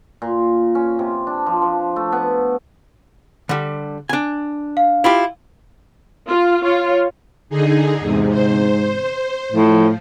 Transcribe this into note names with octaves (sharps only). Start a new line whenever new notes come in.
A#2
C#4
C3
D4
F3
F3
A3
B3
D3 G3
D4 G#5
F5
E4 F4 G4
F4
F4 C#5
D3 D#4 G#4
E2 G#2 C3
C5
A2 F3